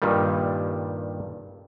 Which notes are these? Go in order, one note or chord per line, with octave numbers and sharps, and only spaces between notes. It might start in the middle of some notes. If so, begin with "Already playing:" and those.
G2 A#2 D#3 G3